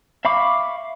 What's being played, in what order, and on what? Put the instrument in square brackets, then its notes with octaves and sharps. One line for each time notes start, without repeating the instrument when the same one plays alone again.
[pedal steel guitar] E5 F5 B5 C#6 D6